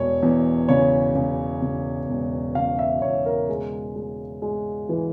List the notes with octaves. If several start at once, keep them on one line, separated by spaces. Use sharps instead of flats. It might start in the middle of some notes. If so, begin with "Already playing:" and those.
Already playing: E1 C#5
E2
C#3 C#5
C#3
C#3
E1
C#3 F5
E5
E1 C#5
A#4
G#3
G#3
G#3
E3